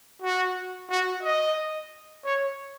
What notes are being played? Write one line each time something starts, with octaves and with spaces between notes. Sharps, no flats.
F#4
F#4
D#5
C#5